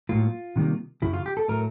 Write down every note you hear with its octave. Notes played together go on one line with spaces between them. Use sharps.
A2 F#3 A#3 F4
C3 D#3 G3 A#3
F#2 C#3 F#3 E4
F4
G4
A4
A2 F#3 A3 A#4